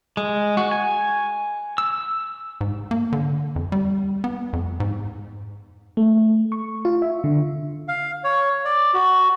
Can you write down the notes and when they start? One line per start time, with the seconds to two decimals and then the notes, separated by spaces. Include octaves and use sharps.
0.17 G#3
0.57 F#4
0.71 G#5
1.78 E6
2.61 G#2
2.91 A#3
3.13 D3
3.56 F2
3.72 G3
4.24 B3
4.53 F2
4.80 G#2
5.97 A3
6.52 C#6
6.85 F4
7.02 E5
7.24 D3
7.88 F5
8.24 C#5
8.65 D5
8.94 F#4